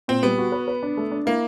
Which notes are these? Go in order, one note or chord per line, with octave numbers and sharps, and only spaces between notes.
A#2 C4
G3 B3
F#4
B4
B4
D4
A3
D4
A#3 E4